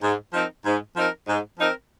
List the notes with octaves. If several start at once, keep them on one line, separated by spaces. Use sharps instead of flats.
G#2
F3 C4 D#4 A#4
G#2
F3 C4 D#4 A#4
G#2
F3 C4 D#4 A#4